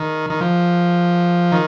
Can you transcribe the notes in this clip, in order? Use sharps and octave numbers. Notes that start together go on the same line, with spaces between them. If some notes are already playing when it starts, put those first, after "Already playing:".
Already playing: D#3
D#3
F3
D#3